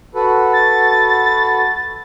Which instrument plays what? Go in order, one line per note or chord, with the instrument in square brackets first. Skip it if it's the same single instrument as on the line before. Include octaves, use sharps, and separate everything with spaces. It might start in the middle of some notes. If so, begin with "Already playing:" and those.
[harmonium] F#4 A4 B4
[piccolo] A6